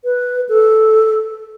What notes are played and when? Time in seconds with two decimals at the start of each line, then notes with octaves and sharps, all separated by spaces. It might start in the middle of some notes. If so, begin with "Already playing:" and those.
0.05 B4
0.49 A4